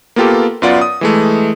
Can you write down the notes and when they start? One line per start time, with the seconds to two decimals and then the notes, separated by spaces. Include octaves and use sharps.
0.16 A#3 B3 F4 G4 A4
0.62 F#2 B3 F4 D5 F#5
0.81 D#6
1.01 E3 G#3 A3